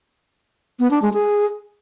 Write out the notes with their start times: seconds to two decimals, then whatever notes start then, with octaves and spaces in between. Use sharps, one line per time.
0.79 B3
0.91 D4
1.02 G#3
1.13 G#4